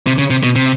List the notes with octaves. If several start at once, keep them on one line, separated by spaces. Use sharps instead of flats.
C3
C#3
C3
B2
C3